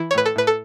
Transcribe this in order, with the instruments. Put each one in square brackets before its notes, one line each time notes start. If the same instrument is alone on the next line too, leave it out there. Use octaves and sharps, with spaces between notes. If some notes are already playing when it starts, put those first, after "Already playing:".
Already playing: [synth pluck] E3 E4
C#5
A2 B4
A4
A2 B4
A4